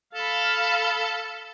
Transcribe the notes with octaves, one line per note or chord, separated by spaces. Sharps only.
A4 F5 B5